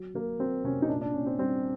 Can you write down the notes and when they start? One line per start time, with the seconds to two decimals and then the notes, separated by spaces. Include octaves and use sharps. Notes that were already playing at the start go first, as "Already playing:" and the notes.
Already playing: F#3
0.15 F#3 A#3
0.39 F#3 C4
0.64 C3 C#4
0.82 D#4
0.89 A#2 D4
1.01 D4
1.14 A#2 C#4
1.26 C4
1.38 G3 C4